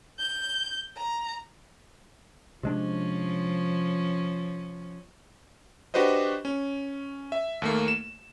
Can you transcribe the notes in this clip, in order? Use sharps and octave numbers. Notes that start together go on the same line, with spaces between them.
G6
A#5
C3 F3 G#3 C#4 D4
D4 F#4 G4 B4 C5 D#5
C#4
E5
D#2 A3 A#3
E7